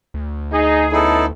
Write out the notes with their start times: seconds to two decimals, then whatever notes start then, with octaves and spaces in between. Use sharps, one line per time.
0.14 D2
0.52 D#4 G#4
0.92 B3 C#4 D#4 E4 A4